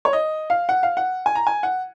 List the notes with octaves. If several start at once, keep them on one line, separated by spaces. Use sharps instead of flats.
C#5
D#5
F5
F#5
F5
F#5
G#5
A#5
G#5
F#5